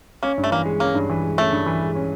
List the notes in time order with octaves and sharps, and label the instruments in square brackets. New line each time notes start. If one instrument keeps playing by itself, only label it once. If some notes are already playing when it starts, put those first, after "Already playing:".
[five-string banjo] A#3 [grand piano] C#4
[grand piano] G2
[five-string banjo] A3
[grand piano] E3 [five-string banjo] A#3
[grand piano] G#3
[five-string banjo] A#3 [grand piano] C#4
[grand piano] G2
E3
G#3
[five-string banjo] A3 [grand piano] C#4
[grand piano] G2
E3
G#3
C#4